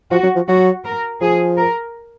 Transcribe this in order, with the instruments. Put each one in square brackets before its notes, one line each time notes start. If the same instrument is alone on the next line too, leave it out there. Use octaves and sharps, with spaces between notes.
[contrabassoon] F3 [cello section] F#4
[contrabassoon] F#3
F3
[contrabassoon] F#3 [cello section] F#4
[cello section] A#4
[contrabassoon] F3 [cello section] G#4
[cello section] A#4